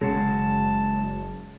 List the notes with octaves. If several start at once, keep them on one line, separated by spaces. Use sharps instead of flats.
F#1 C#3 F#3 G#3 F#4 A5